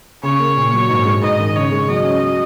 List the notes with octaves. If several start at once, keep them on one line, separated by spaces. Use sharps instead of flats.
C#3 C#5
A#3
A#2
F#3
G#2
G#3
G#2 D#5
D#3
C#3 C#5
G#3
F#3 D#5
C#4
F#3